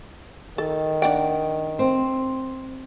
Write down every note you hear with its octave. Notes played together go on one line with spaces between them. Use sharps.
D#3 A4
D4 F#5 G5
C4